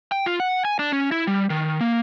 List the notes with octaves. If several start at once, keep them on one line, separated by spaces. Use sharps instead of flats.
G5
F4
F#5
G#5
D4
C#4
E4
G3
D#3
A#3